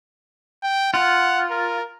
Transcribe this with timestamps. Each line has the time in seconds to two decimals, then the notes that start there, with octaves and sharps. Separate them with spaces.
0.63 G5
0.94 F4 F#5
1.50 A#4